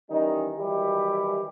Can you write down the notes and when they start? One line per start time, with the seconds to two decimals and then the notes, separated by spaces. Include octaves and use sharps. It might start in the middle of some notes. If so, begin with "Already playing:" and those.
0.11 D#3 E3 G3 C#4 D#4
0.58 D#3 E3 F#3 G3 E4 G4